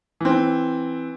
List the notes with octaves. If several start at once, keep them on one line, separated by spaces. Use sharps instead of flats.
E3 C4